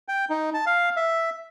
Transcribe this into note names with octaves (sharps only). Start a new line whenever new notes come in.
G5
D#4
A5
F5
E5